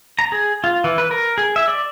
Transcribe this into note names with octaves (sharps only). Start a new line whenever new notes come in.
A#5
G#4
F4
E3
B4
A#4
G#4
E5
D5